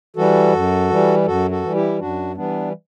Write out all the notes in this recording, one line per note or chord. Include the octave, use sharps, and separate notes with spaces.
E3 G3 F#4 A4
F#2
E3 G3
F#2 F#4 A4
F#4 A4
E3 G3
E4 G4
F#2 D4 F#4
E3 G3 B3 D4